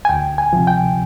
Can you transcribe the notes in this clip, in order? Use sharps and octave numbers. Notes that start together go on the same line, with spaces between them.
G#5
D2 G5
G#5
C3 F3
G5